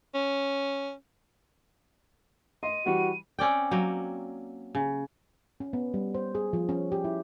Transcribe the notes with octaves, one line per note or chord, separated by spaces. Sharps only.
C#4
D#5 C6 D#7
E3 G3 F#4
C4 C#4 D5 G5
F#3 A#3 G5
C#3
C#4
B3
G3
C5
G#4
F3
C#4
G4
E4